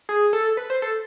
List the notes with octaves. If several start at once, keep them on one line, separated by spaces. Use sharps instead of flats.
G#4
A4
B4
C5
A4